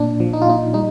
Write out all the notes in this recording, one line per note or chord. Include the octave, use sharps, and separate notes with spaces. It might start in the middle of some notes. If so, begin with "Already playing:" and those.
Already playing: A#2 D4
F3
D#4
F4
A#2 D#4
G3 D#4